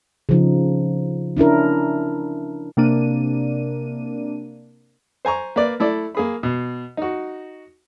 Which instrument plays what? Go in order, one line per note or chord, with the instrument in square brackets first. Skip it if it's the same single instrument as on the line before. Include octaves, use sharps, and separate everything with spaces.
[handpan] C#3 F3 D#4
C#4 D4 E4 A#4
[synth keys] C3 A#3 D4 D#7
[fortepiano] C5 G#5 A#5 C#6
A#3 B4 D5
A3 E4 A4 D5
A#3 G#4 B5
B2
D#4 F#4